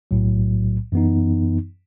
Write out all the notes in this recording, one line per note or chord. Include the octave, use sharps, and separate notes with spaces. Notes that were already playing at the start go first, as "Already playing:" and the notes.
B1 A2 F#3
F#2 E3 B3 D#4